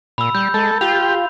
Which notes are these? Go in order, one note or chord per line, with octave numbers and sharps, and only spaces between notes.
A#2 B5 E6
G3 G6
G#3 A4
F4 G4 F7